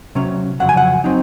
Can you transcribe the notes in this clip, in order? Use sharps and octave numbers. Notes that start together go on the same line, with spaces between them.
C3 F#3 C#4
F2 C#3 F#3 F#5
G#5
F#5
F#3 C4 D#4